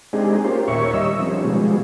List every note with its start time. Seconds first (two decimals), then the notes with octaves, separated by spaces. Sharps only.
0.13 G#3 C4 D4 D#4 G4 G#4
0.44 A#3 C#4 F4 G4 C5
0.68 D#2 A#2 C#5 E5 C#6
0.94 G3 D#5 E6
1.19 D#3 F3 G3 C4 C#4
1.44 B2 F3 G3 G#3